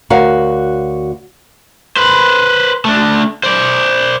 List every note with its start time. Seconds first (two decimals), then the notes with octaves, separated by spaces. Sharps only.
0.10 D2 F#4 A#4 C#5 F5 F#5
1.97 B4 C5
2.85 A3 D4
3.44 C5 D5